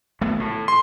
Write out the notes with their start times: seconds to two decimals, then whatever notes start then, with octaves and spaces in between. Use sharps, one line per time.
0.21 G#1 A3 B3
0.40 A2
0.68 C6